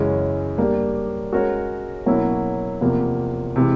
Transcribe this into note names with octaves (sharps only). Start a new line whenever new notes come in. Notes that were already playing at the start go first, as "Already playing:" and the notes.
Already playing: F#2 C#3 E3 G#3 C#4
G3 A#3 D4 G4
G#3 C#4 F#4 A#4 C#5
B2 F#3 A#3 C#4 E4
E2 C3 F3 A#3
C3 E3 G#3